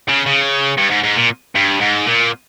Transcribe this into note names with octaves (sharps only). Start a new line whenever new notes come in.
C#3
C#3
G2
G#2
G#2
A#2
G2
G#2
A#2